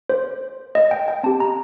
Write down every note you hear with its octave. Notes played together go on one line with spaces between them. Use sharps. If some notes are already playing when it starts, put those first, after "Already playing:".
C5
D#5
G5
G5
C4 G4 A5
A#5